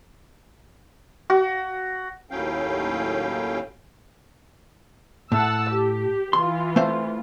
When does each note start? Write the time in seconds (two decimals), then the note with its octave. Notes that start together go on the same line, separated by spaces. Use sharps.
1.30 F#4
2.31 D#2 A2 F#3 C#4 F5 G5
5.32 A2 F#5 A5 E6
5.70 G4
6.33 E3 F4 C6
6.76 A3 C4 C5